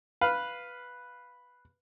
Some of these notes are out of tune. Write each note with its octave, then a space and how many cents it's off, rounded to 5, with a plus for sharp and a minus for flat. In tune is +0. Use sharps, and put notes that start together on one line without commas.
B4 +0 F5 +0